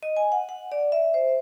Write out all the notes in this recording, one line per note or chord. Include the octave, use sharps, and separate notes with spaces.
D#5
G#5
F#5
F#5
D5
E5
C5